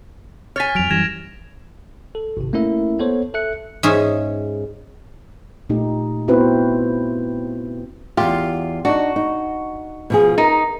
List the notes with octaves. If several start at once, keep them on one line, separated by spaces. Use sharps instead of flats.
C#5 G#5 F6 A6 B6
F2 F#3 F6 D7 F7
F#2 E3 G3 G#6 A#6 E7
A4
G#1 C3
A3 A#3 C#4 E4 A#4 E5
B3 A4 C5 C#5
A4 E5 F#6 C#7
G#2 C#4 E5
A#2 A3 D#4 G4 D#5
B3 C4 E4 F#4 B4 C5
E2 F4 G4
D4 D#4 F#4
D#4
B2 F3 G#4
D#4 A#4